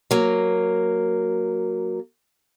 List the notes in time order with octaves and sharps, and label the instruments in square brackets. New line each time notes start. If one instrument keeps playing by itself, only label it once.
[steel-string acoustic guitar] F#3 A#3